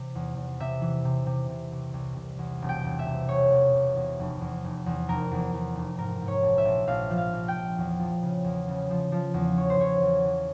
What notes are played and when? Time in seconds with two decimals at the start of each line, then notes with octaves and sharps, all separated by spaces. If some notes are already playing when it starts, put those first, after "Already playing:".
Already playing: C3 E3
0.15 E2
0.37 E2
0.60 C3 E5
0.81 E3
1.05 C3
1.26 C3
1.50 C3
1.72 C2
1.94 C2
2.17 C2
2.39 E2
2.62 E1
2.69 G5
2.85 E1
2.99 E5
3.06 C3
3.28 E1 C#5
3.51 E2
3.74 C3
3.96 E2
4.19 F1
4.41 E2
4.64 F1
4.86 E2
5.08 F1 A#4
5.31 E2
5.54 E2
5.75 F1
5.98 G#2 A#4
6.21 G#2
6.28 C#5
6.43 A#1
6.58 E5
6.65 A#1
6.87 A#1 F5
7.10 F3
7.18 F5
7.33 A#1
7.48 G5
7.56 A#1
7.78 E2
7.99 F3
8.22 C#3
8.44 E2
8.68 C#3
8.90 F3
9.12 F3
9.34 E2
9.57 E3 C#5
9.70 C5
9.79 E2 C#5
10.01 E2
10.25 E3